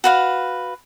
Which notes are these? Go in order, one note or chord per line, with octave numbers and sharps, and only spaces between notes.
F#4 B4 F5